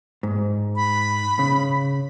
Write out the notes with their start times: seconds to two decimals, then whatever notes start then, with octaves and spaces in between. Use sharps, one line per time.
0.23 G#2
0.76 B5
1.39 C#3